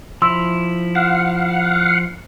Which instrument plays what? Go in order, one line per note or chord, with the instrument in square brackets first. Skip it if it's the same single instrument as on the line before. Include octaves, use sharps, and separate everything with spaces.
[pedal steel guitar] F3 E4 [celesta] C6 E6
[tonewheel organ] F5 F#5